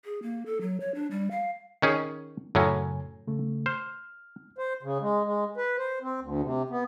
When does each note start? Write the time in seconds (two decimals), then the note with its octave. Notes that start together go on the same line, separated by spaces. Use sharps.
0.05 G#4
0.22 A#3
0.46 A4
0.61 F#3
0.80 C#5
0.95 D4
1.11 G3
1.31 F5
1.82 D#3 C#4 G#4
2.55 F#2 A2 C#3 F#3 C#4 G#5
3.28 C#3 A3
3.66 C5 F6
4.58 C5
4.83 C#3
5.01 G#3
5.25 G#3
5.57 B4
5.78 C5
6.01 C4
6.21 D2
6.42 C3
6.70 B3